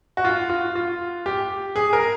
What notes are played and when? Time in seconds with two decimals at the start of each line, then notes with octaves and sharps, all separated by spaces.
0.17 F#4
0.24 F4
0.50 F4
0.75 F4
1.26 G4
1.76 G#4
1.93 A#4